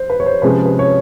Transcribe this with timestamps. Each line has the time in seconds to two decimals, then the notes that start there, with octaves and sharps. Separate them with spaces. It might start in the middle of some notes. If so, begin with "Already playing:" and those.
Already playing: C5
0.10 B4
0.20 C#5
0.26 C5
0.42 C3 F3 G#3 C#4 B4
0.65 B4
0.79 C#5